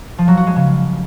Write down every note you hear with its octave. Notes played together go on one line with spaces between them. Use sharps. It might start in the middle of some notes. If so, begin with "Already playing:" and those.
F3
F#3
F#4
G#3
C#3